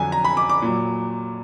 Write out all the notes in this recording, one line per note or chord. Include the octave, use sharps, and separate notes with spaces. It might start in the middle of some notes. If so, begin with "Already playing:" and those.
Already playing: F2 D3 F#3 G#5
A#5
B5
D6
D6
A#2 F#3